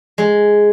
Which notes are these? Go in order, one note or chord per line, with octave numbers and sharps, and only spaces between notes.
G#3